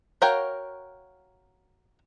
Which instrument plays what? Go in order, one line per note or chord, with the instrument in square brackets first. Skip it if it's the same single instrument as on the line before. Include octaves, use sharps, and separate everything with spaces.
[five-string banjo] F#4 A#4 C#5 F5 G5